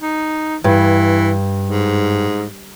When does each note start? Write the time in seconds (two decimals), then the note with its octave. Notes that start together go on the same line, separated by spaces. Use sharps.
0.02 D#4
0.64 G2 E3
1.69 G#2